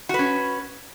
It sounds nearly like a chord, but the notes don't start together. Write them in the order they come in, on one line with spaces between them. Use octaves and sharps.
F#4 B4 C#4